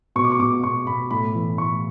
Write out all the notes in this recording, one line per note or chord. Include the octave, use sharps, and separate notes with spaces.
B2 C#6
D6
C#6
B2 D6
B2 C#6
B2 B5
A2 B5
E3
A2 C#6